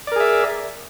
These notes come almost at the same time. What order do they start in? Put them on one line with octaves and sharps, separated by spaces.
D5 A#4 G#4 E5